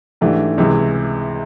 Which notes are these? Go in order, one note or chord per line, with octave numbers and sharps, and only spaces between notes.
G#2 E3 A3 D4 G4
C#2 C3 E3 G#3